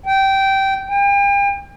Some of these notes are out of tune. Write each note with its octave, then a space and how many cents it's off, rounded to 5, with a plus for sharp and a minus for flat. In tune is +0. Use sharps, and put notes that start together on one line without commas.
G5 -15
G5 +40